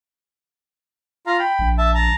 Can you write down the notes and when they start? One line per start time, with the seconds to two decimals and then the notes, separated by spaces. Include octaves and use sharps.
1.26 F4 F5 A#5
1.39 G5 B5
1.59 A#1
1.78 E5 A5
1.94 A5 A#5